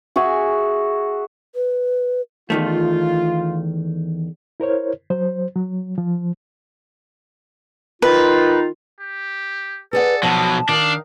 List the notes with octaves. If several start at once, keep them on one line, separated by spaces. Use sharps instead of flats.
F#4 G#4 E5 G#5
B4
E2 D#3 A3 F4
E4 A#4 C5 C#5
F#3 C5
F#3
F3
D#3 D#4 F4 B4
G4
G#4 A4 B4 D5 F#5
B2 F3 F#3 G#3 A5
D#3 D4 F5